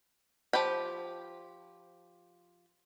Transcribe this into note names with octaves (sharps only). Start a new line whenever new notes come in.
F3 G4 G5 B5